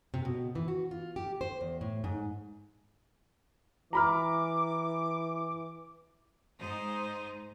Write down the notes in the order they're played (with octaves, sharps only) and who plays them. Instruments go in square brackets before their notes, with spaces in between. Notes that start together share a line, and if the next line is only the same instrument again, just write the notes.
[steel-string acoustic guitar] C3
B2
E3
F#4
F4
G4
C5
E2
A2
G#2
[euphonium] E3 [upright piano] A#5 B5 F6 [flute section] D6
[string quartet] G#2 D#4 C5